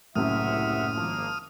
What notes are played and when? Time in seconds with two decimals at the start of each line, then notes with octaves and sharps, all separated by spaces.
0.16 F#1 C2 F#2 A2 E5 F#5 D#6 F6
0.97 G#1 F3 A#3